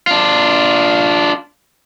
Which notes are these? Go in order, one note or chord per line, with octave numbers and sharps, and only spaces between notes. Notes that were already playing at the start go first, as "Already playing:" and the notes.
D4 F4